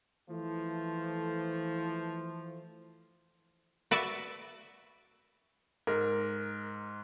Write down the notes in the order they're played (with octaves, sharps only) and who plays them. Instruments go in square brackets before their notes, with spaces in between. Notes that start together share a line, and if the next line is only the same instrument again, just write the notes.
[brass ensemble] E3 F3 A3
[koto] F#4 B4 D5 E5
[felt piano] G#2 [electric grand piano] A#4